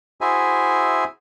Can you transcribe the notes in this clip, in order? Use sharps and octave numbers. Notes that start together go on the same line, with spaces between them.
E4 F#4 G#4 C5 E5 G#5